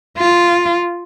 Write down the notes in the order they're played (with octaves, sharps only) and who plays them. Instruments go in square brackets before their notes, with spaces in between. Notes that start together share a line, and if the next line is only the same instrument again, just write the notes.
[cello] F4